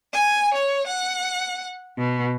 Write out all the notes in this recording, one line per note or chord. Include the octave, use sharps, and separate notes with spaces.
G#5
C#5
F#5
B2